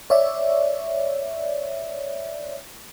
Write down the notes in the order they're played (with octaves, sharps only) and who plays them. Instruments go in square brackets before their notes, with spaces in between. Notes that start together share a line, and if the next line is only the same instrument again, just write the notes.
[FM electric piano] C#5 D5 E5